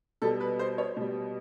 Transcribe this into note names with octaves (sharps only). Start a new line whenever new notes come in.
B2 G3 A4
B4
C5
C#5
B2 G3